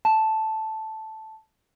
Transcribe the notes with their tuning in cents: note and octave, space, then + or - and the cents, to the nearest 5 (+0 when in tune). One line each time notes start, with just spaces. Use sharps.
A5 -5